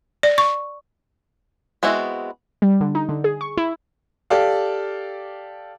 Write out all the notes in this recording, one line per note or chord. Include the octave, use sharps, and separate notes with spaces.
D5
C#6
G#3 B3 C4 E4 F#4
G3
D3
D#4
D3
G#4
C#6
E4
G4 A4 D5 F5